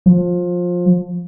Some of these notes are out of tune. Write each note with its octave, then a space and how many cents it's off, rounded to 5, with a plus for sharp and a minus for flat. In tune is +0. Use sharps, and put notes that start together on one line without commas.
F3 +20